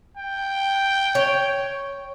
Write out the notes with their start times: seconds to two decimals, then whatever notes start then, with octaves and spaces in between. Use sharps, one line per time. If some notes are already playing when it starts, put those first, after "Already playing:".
0.17 G5
1.15 C#5